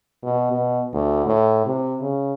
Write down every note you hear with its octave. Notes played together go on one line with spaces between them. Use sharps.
B2
B2
D2
A2
C3
C#3